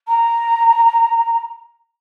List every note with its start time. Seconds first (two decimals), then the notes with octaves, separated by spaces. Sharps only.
0.07 A#5